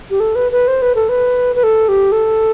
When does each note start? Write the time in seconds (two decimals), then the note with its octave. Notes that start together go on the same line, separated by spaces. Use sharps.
0.10 G4
0.20 A4
0.35 B4
0.52 B4
0.68 C5
0.82 B4
0.95 A4
1.09 B4
1.56 B4
1.63 A4
1.88 G4
2.12 A4